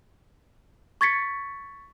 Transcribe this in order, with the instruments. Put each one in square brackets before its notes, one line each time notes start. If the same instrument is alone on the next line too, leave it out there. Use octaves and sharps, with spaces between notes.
[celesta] C#6 G#6 A6 B6 C#7